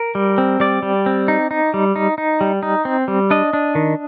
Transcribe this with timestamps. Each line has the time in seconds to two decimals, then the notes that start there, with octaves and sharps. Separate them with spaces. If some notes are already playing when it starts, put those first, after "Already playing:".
Already playing: A#4
0.15 G3
0.38 C4
0.60 G3 D5
0.83 G3
1.06 C4
1.28 D#4
1.51 D#4
1.74 G3
1.96 D#4
2.18 D#4
2.41 G3
2.63 D#4
2.85 C4
3.08 G3
3.31 D4 D#5
3.53 D4
3.75 D#3